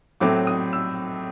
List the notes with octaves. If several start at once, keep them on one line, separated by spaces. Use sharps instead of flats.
A2 F#3 A3 C4 D6
D#6
E6